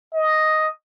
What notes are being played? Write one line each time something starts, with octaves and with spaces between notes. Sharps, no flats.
D#5